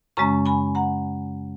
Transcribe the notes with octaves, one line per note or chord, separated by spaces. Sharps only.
F#2 C#3 G#3 C#4 A#5 C#6
G#5 B5
F#5 A#5